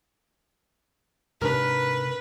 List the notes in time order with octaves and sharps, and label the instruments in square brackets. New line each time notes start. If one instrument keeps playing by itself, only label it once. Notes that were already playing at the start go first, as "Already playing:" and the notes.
[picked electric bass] G#2 C3 D4 [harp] A#4 [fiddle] B4